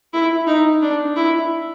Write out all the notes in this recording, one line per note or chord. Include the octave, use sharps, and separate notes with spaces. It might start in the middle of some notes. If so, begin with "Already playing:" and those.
E4
D#4
D4
E4